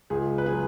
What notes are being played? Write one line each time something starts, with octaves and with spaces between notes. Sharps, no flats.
C#2 G#4
B4
C#3 F#3 G#4